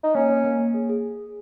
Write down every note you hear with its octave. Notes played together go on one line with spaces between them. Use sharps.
D#4
A#3 C#4
A#3
A#3
A#3
G#4
G#4